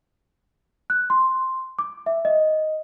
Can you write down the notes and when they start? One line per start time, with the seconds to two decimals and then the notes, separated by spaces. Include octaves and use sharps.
0.90 F#6
1.10 C6
1.79 D6
2.06 E5
2.25 D#5